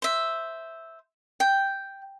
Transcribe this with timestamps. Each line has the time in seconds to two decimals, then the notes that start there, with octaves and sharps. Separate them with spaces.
0.02 C5 E5
1.40 G5